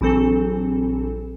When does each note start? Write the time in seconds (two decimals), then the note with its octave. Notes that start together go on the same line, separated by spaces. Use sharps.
0.01 A#1 E3 F#3 C4 A4